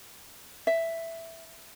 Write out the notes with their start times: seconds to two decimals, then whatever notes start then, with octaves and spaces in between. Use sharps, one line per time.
0.67 E5